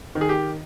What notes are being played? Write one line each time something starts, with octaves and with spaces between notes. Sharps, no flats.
D#3
G#4
G4